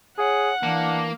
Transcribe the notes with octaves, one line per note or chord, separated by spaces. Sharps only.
G#4 C#5 F#5
E3 A#3 D4